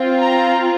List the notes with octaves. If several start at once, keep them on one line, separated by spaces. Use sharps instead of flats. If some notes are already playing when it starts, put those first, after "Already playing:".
Already playing: C4 F4
A#5